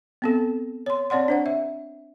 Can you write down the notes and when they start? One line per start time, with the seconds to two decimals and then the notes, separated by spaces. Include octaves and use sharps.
0.22 B3 C4 A4
0.86 C#5 C6
1.10 C4 C#5 D5 F#5 C6
1.28 D4 C5 F#5
1.46 E5